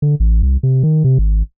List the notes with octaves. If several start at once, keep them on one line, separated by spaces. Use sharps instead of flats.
D3
A1
C2
C3
D#3
C3
G#1